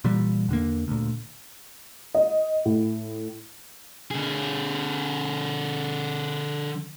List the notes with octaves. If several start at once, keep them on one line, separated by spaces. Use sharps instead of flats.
A#2 E3 G3
E2 D3 A#3
D2 A#2
D#5
A2
D3 G#4